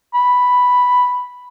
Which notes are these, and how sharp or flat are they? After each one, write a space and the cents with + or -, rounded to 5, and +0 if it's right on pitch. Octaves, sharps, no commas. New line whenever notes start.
B5 +0